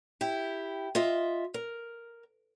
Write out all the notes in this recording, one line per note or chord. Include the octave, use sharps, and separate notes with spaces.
E4 G4
F4 D#5 E5
A#4